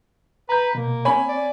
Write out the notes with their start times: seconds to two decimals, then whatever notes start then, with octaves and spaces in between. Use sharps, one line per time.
0.49 B4 A#5 G6
0.75 B2 A#3
1.05 C4 C#5 G#5 B5
1.28 D5